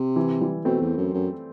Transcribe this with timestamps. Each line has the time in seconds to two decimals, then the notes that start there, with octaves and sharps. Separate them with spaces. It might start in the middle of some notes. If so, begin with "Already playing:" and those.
Already playing: C3
0.16 E3
0.41 E3 G3
0.65 B2 A3 C4
0.81 E2
0.97 F#2
1.13 F#2